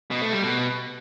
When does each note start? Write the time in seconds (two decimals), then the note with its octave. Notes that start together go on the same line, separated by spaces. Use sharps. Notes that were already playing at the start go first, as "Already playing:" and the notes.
0.11 B2
0.22 A3
0.32 G3
0.43 B2